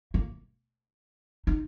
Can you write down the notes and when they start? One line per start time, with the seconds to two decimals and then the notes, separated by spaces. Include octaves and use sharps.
0.14 A#3
1.47 D#4